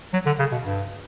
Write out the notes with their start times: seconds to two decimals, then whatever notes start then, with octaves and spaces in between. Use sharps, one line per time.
0.14 F#3
0.26 D3
0.39 C#3
0.52 B2
0.65 G2